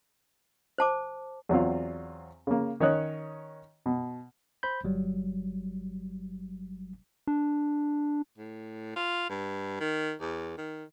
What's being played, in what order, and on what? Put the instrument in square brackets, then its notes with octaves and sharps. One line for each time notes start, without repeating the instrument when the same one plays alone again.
[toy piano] C5 A5 D6
[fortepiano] E2 F#3 C4 F4
C#3 A#3
D#3 C#4 C#5 D#5 D#6 F#6
B2
[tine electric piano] C5 B5 G6
G1 F#3 G3
[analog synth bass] D4
[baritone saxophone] A2
F4
G2
D#3
E2
D#3